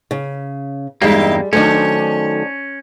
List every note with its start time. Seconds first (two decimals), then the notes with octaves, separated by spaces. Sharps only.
0.11 C#3
1.02 E2 G2 G3 G#3 A#3 D#4 E4 G4
1.53 D#3 F#3 A3 C#4 D4 C5